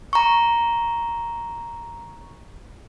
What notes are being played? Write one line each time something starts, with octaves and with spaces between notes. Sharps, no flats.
A#5 C#6